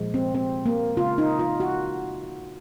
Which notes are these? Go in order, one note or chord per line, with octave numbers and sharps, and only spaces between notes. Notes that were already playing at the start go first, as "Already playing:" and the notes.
Already playing: A#2 F3 G#3
C4
C4
A#3
C#3 G#3 F4
D#4
F4
F#4